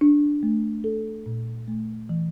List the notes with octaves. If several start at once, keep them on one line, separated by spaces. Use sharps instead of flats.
D4
A3
A4
A#2
A3
E3